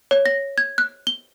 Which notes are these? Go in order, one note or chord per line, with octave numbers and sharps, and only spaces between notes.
C#5
A#6
G#6
F#6
G7